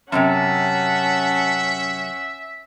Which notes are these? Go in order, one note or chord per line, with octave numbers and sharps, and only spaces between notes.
F#2 A2 C3 C#4 E5 F#5 A5